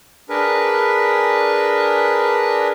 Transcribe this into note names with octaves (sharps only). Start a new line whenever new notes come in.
D4 G#4 A#4 B4